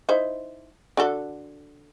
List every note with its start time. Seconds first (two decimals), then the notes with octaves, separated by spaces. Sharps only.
0.09 D#4 E4 C5
0.97 D3 F#4 A4